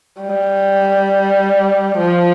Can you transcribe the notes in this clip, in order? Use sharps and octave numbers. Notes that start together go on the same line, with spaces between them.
G3
F3